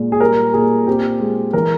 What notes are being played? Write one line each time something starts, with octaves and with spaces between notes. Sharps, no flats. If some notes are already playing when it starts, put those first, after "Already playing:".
Already playing: A#2 G#3
G#4
G3 A#4
A#2 G#4
C4 G4
G#3
E3 A#4